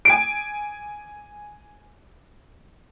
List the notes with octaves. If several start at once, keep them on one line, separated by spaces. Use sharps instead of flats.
G#5 D7